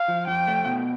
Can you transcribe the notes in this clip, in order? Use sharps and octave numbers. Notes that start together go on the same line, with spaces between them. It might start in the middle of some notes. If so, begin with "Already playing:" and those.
Already playing: F5
F3
F2 G5
A3
B2